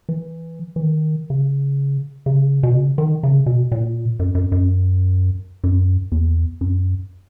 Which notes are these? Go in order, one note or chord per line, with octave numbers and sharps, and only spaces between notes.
E3
E3
D#3
C#3
C#3
B2
C#3
D#3
C#3
B2
A#2
F#2
F#2
F#2
F#2
E2
F#2